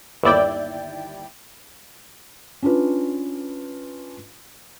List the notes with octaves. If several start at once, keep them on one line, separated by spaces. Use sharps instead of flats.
G1 D#2 E4 D5 G5
C#4 D4 F4 B4